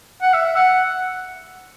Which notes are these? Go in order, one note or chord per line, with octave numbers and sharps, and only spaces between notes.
F#5
E5
F#5